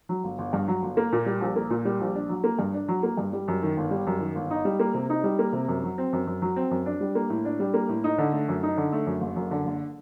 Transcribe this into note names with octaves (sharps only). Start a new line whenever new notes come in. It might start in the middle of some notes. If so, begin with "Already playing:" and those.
F#3
G1
G1
G2
F#3
G1
A#3
A#2
G3
A#1
A#3
A#2
G3
A#1
D4
F#3
A#3
G2
D4
F#3
A#3
G2
G3
F#2
D#3
G1
G3
F#2
D#3
G1
D#4
G3
A#3
C3
D#4
G3
A#3
C3
F#2
F#3
C4
F#2
F#2
F#3
C4
F#2
D4
G3
A#3
A2
D4
G3
A#3
A2
D#4
D3
A3
F#2
D#4
D3
A3
F#2
F#1
F#2
D3
F#1